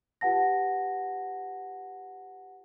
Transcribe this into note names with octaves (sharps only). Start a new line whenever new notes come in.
F4 G4 B4 F#5 A5 A#6